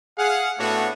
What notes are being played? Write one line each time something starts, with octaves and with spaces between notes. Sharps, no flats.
G#4 F5 F#5
A2 A3 B3 D4 F#4 C#5